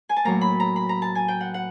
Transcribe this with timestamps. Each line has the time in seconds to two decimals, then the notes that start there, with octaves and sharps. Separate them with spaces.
0.09 G#5
0.16 A5
0.24 A2 F#3 A#3 A#5
0.41 B5
0.60 A#5
0.76 B5
0.89 A#5
1.02 A5
1.15 G#5
1.28 G5
1.41 F#5
1.54 F#5